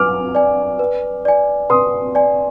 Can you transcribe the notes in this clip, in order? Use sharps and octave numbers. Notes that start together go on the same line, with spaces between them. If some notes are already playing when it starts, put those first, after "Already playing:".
Already playing: B4 D6 F6
D5 G#5
B4
D5 G#5
B4 C6 D#6
D5 G#5